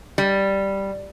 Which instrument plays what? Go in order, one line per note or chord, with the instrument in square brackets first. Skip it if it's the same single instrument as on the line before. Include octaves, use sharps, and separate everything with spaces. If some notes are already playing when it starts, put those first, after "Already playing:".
[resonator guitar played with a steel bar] G3